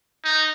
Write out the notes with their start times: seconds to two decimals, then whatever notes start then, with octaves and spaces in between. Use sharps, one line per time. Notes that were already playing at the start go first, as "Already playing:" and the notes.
0.24 D#4